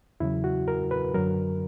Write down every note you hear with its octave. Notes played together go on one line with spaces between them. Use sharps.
E2 C#3 F#3 E4
F#4
A#4
B4
F#2 D3 F#3 A#4